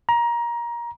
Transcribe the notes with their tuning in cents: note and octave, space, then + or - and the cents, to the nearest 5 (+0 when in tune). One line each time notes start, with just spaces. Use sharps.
A#5 +20